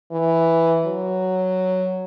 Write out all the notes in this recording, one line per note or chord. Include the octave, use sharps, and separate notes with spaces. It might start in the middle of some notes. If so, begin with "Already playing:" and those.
E3
F#3